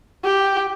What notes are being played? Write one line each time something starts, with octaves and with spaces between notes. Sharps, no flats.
G4